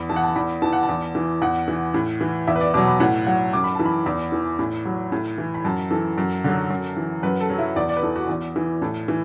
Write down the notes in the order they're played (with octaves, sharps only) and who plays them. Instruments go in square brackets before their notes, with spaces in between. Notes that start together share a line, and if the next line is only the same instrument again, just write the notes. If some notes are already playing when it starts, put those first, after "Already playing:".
Already playing: [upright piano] E2 B5
E3 A5
F#5
A5
E2 B5
E3 A5
F#5
A5
E2
E3
E2 F#5
E3
A2
E3
E2 E5
B4
D5
B2 F#3 D6
B5
A2 F#5
F#3 F#5
F#2 D6
B5
E3 A5
B5
E2
E3
A2
F#3
A2
E3
B5
F#2 A5
E3 A4
F#2
D3 F#3
F#2
E3
F#2 B4
A4
F#3
E4
E2 D5
D5
B4
E3 A4
F#4
E2
E3
A2 A4
E3